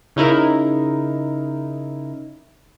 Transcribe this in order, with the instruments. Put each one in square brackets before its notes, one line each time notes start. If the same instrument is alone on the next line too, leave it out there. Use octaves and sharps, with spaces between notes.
[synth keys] C#3 D#4 E4 A#4